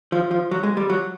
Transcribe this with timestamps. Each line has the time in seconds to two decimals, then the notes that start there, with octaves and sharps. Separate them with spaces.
0.12 F3
0.31 F3
0.51 F#3
0.63 G#3
0.77 G3
0.90 F#3